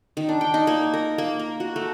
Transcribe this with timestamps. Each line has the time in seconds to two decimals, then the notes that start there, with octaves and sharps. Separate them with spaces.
0.17 D#3
0.29 D4
0.41 G5
0.54 D#4
0.67 A#3
0.94 A#4
1.18 A#3
1.39 A#4
1.60 F#4
1.76 A3